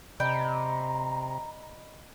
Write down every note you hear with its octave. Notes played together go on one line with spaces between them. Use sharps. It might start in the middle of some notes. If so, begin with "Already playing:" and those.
C3 D5 D#5 G5 A#5 B5